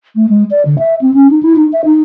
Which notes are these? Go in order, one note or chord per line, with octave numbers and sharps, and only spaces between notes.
A3
G#3
D5
D3
E5
C4
C#4
D#4
E4
D#4
E5
D#4